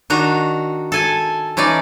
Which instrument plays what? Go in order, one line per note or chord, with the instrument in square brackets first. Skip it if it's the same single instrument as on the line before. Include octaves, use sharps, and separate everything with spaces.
[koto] D#3 D4 F#4 A#5
A4 G#5 A5
E3 C#4 D#4 D5